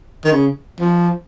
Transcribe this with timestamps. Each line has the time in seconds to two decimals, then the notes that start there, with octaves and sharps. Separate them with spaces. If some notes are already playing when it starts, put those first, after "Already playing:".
0.25 D#3
0.32 C#3
0.80 F3